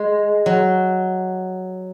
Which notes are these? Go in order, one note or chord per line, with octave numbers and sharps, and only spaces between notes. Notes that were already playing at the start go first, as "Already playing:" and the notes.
Already playing: G#3
F#3